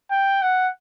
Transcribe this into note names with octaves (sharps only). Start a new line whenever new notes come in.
G5
F#5